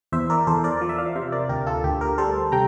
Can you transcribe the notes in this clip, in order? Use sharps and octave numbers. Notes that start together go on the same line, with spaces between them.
E2 C5 E5
A#4 D5
E2 A4 C5
A#4 D5
F3
E5
D5 F5
C3 C5 E5
A#4 D5
D2 G4 A#4
F4 A4
D2 G4
G4 A#4
G3 A4 C5
C3 G5 A#5